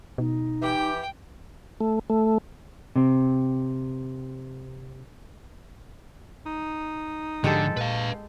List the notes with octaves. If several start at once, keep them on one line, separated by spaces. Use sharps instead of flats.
B2 D#4
E3 G4 G5
A3
A3
C3 C4
D#4
G#2 D3 F3 G#3 G4 A4
A#2 B4 F5